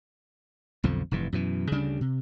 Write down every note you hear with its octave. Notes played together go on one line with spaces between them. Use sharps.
B1 F2 D3 F3
F1 G2 E3
F#2 B2 E3
D2 C#3 G3 D4
C3